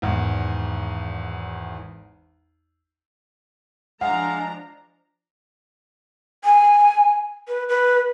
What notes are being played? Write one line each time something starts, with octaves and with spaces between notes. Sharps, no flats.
G#1 E2
F3 G#3 D4 F5 F#5 A#5
G#5
B4
B4